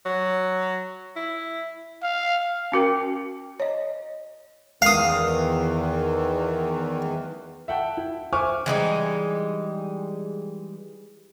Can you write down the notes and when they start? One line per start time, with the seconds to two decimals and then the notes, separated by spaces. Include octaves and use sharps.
0.06 F#3
1.16 E4
2.03 F5
2.72 C#4 F#4 A#4 G5
3.60 C#5 D#5
4.82 E2 D#3 E3 F5 D#6
7.68 E5 F#5 G5 A5
7.97 E4
8.32 C5 E5 G#5 C#6 D6 F6
8.66 E3 G3 G#3 D#4